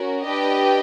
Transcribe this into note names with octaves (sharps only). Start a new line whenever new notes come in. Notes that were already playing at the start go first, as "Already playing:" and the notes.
Already playing: C#4 F#4 A#4
D4 G4 B4 D#5 G5